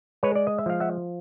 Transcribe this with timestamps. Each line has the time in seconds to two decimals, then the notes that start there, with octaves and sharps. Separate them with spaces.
0.23 G#3 B4 C#5
0.35 D5
0.47 D#5
0.58 E5
0.66 F3 F5
0.80 E5 F#5